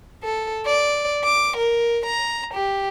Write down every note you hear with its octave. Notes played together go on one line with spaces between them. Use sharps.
A4
D5
D6
A#4
A#5
G4